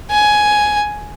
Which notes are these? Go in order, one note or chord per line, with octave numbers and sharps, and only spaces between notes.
G#5